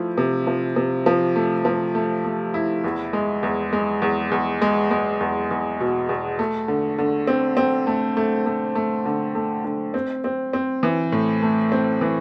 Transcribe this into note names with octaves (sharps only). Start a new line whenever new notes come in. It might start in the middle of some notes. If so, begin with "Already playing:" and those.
Already playing: F3 A3 E4
C3
F3
C3
F3
A3
F3
A3
A3
E4
E2
G#3
E2
G#3
E2
E2
G#3
G#3
E2
E2
B2
E2
A3
D3
D3
C4
C4
A3
A3
A3
A3
D3
A3
D3
C4
C4
C4
E3
A2
A3
C4
E3